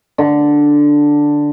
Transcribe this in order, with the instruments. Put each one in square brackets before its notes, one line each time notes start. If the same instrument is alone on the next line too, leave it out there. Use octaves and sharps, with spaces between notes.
[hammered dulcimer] D3